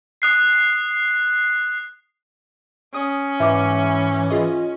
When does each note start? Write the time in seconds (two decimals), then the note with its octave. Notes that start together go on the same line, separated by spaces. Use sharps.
0.22 D#6 F#6 C7
2.94 C#4 D#6
3.40 G#2 E3 E5 D6
4.31 F4 G#4 D#5